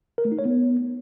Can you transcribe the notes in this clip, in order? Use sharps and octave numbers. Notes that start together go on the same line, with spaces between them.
A#4
A3
D#4
C#5
B3